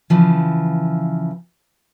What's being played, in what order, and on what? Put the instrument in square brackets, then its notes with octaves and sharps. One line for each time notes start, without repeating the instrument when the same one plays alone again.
[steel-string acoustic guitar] C#3 E3 F3